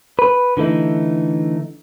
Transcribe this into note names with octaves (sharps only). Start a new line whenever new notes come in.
B4
D3 E3 A3 D#4